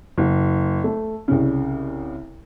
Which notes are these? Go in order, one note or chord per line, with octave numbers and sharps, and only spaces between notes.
F#1
A3
C2 C#3